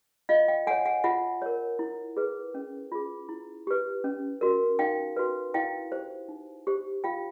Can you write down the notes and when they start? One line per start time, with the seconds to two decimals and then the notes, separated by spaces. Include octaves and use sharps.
0.29 F4 D#5 F5
0.48 F5 G5
0.67 A4 F#5 G#5
0.71 C#5
0.85 F#5 G#5
1.04 F4 E5 F#5
1.42 A#4 C#5
1.79 E4
2.17 G#4 B4
2.54 C#4
2.92 F4 G#4
3.29 E4
3.67 G4 B4
4.04 C#4
4.41 F#4 A#4
4.79 D#4 F5 G5
5.17 F#4 B4
5.54 E4 F5 G5
5.92 G4 C5
6.29 D#4
6.67 G4 C5
7.04 F4 F5 G5